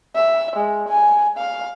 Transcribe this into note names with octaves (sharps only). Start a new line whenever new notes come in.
E5
G#3
G#5
F5